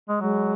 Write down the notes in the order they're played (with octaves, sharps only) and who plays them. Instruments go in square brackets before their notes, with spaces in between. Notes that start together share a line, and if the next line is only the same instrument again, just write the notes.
[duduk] G#3
[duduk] F#3 [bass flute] G#3